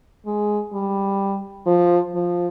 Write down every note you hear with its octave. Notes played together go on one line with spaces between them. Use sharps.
G#3
G3
F3
F3